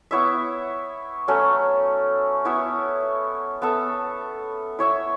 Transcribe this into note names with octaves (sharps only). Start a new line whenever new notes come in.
B3 E4 C#5 E5
F#3 A3 C#4
B3 E4 C#5 E5
B3 A4 E5
E4 C#5 E5